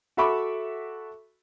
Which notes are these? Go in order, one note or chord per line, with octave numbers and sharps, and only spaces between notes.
F#4 A4 E5 B5 C#6 D6